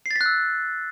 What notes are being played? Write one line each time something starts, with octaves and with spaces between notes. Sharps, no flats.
C7
A6
B6
F#6
E6